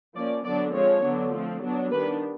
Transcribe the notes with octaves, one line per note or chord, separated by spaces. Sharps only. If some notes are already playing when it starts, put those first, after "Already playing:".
F3 A#3 C#4 D5
D3 F#3 B3 D4 D5
F3 G#3 C4 C#5
D3 F#3 B3 D4
F3 A3 C4
F#3 B3 D4
D#3 G3 B3 D4 B4